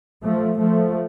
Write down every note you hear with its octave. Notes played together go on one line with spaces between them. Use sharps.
F3 A3
F3 A3